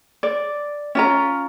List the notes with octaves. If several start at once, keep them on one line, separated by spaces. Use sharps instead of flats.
D5
C#4 F4 A#5